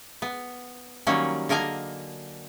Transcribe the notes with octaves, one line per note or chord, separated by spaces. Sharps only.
B3
D#3 F#3 G3 A#3 C#4
D3 A#3 A#4 D#5 G#5 A#5